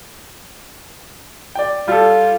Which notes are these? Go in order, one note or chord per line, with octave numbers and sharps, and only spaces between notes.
D5 G5
G3 F4 A4